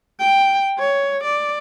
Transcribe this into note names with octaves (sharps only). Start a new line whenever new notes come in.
G5
C#5
D5